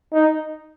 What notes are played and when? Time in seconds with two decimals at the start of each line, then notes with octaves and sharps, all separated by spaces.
0.13 D#4